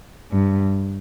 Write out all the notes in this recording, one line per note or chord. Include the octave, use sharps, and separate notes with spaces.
G2